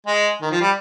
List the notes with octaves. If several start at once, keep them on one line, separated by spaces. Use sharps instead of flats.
G#3
D#3
F3
G3